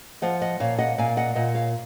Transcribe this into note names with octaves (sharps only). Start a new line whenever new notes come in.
F3 D#5 F#5
D#5 F#5
A#2 C#5 F5
D#5 F#5
A#2 F5 G#5
D#5 F#5
A#2 D#5 F#5
C#5 F5